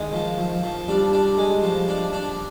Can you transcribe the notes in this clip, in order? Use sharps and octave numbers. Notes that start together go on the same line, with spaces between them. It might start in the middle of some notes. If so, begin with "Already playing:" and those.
Already playing: D#3 G#3
F3
F3
F3
G3 D4
D4
G#3
F3
D4
D4